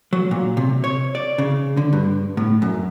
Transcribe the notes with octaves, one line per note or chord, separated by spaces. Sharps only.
F#3
A#2
C3
C#5
D5
C#3
D3
G2
A2
F#2